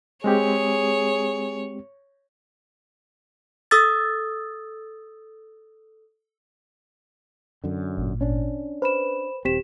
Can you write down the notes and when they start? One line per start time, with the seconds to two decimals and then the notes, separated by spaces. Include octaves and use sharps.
0.24 G#3 C4 G4 G#4 C#5
3.71 A4 D#6 E6 A6
7.64 F#2 D3
7.97 G#1 A#2
8.21 C#4 D4
8.82 B4 C5 B5 E7
9.45 D#1 C4 G4 B6 E7